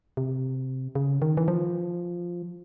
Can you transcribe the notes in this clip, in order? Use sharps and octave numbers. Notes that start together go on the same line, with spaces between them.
C3
C#3
D#3
E3
F3